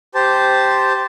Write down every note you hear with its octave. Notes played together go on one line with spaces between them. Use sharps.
G4 C5 A5